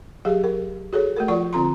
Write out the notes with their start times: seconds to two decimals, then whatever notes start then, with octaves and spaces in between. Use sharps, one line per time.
0.25 F#3 G4 G#4 F5
0.44 A#4
0.93 F#4 G#4 A4 C#5
1.16 A3 F#4 A#4
1.28 F3 F4 D5 F#5 C#6
1.53 D3 C4 F4 A#5 C6